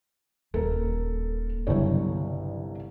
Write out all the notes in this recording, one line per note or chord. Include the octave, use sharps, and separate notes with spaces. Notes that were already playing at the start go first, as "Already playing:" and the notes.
D#1 A4 A#4
G1 C2 C#3 F#3 C#5